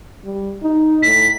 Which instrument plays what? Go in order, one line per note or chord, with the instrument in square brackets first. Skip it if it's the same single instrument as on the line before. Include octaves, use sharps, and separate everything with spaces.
[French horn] G3
D#4
[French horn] A2 [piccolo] B6